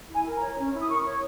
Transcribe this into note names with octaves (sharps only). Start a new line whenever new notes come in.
E4 G#5
A#4
A#5
C#5
C#4
E4
D#6
A#4 C#6
C#5